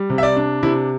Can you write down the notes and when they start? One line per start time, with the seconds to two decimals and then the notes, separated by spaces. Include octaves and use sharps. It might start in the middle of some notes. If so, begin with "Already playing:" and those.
Already playing: G3
0.10 C3
0.18 E5
0.23 D5
0.36 D4
0.63 C3 E4